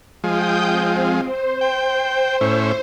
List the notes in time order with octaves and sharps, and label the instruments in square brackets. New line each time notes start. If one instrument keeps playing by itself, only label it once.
[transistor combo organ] F3 G#3 [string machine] G5 D#6 G6
[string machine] C4
C5
[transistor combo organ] G5
A2 C#4 E4